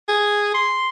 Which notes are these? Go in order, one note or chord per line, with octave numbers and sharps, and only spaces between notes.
G#4
C6